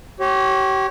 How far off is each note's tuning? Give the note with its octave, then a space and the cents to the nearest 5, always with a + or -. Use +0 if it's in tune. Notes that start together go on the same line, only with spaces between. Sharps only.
G4 -35 C#5 -20